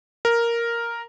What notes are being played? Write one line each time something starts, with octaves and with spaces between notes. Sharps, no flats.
A#4